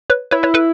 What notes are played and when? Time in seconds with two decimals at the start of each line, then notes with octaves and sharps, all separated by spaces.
0.10 B4 C#5
0.31 E4 B4 C#5
0.43 B4 C#5
0.54 A4 B4